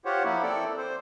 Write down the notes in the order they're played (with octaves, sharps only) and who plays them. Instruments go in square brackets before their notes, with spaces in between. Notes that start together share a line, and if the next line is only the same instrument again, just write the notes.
[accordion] F4 G4 C5 C#5 F#5
F3 A#3 E4
C4 A4 D5
C5